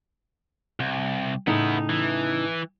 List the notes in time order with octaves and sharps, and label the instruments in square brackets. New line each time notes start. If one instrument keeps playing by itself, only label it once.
[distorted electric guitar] C2
[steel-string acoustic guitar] A2 C#3 D#4 [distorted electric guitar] B3 E4
[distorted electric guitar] E3